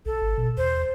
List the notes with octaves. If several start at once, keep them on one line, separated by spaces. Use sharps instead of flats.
B1 A4
G#1
B2
E2 C5